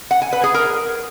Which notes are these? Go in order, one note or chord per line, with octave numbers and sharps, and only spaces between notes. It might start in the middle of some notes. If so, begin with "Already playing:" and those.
F#5
G#5
B4
G#4
A#4